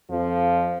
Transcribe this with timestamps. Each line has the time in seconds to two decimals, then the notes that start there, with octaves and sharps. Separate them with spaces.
0.10 F2 F3